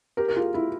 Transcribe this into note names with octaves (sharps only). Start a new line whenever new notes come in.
G4 A#4
A#4
F4 G#4
E4